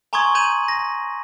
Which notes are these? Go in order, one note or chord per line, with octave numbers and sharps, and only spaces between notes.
G#5 A#5 C6 C#6 D#6 G#6
A#5 G6 G#6 D#7 F#7
A#6